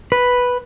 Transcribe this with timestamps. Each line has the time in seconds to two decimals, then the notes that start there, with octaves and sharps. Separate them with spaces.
0.12 B4